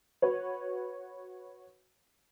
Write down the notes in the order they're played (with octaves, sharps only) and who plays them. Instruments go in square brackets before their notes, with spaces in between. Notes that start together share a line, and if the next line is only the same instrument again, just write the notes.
[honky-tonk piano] F#4 B4 C#5